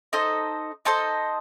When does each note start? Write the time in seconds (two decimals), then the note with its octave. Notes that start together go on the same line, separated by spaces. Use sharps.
0.13 D#4 A4 C5 D#5
0.85 D#4 A4 C5 D#5